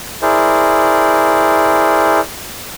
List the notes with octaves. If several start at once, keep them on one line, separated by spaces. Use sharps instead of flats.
E4 G#4 A#4 C5 D5